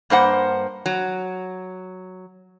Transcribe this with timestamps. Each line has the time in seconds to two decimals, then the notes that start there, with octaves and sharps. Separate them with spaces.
0.10 G2 A#3 C5 F#5
0.86 F#3